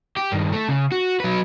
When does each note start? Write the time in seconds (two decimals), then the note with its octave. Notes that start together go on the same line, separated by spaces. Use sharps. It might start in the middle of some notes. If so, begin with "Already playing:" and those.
0.17 G4
0.32 G2 D#3
0.53 A3
0.69 C#3
0.92 F#4
1.20 F#3 B4